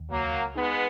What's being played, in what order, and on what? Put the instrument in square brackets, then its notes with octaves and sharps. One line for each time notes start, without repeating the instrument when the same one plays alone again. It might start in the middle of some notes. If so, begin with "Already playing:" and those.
Already playing: [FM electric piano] D#2
[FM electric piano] C#2 [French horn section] F#3 A#3
[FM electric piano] C#2
[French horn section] G#3 B3 [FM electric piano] D#4